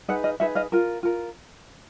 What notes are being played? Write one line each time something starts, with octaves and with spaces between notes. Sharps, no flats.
D#4 G#4 B4 E5 F#5
D#5 F5
D#4 G#4 B4 E5 F#5
D#5 F5
F4 A#4
F4 A#4